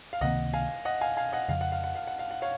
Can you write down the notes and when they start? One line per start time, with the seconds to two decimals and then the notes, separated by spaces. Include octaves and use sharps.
0.13 F5
0.21 C#2 C3 D#3 A#3 D#5 F#5
0.54 F5 G#5
0.85 D#5 F#5
1.01 F5 G#5
1.17 F5 G#5
1.33 D#5 F#5
1.48 F2 C#3 F3 F5
1.61 F#5
1.72 F5
1.84 F#5
1.95 F5
2.07 F#5
2.19 F5
2.31 F#5
2.42 C#5 F5